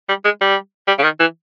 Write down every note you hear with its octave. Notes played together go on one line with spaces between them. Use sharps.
G3
G#3
G3
G3
C#3
D#3
E3